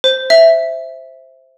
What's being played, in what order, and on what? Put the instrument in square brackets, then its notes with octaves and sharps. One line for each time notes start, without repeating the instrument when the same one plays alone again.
[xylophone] C5
E5